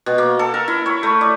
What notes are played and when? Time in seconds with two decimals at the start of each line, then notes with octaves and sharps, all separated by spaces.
0.06 B2
0.18 A#3
0.39 A4
0.54 A#4
0.68 E4
0.86 C#5
1.03 A3
1.21 D5